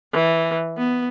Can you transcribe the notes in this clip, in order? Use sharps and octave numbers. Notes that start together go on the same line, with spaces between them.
E3
B3